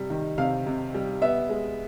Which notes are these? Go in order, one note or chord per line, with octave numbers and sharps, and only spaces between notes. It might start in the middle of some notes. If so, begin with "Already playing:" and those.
Already playing: C3 G3
D#3
C3 F5
C3
G3
B3 E5
G#3